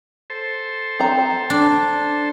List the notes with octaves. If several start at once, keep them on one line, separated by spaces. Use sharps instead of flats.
A4 C5
C4 A#5
D4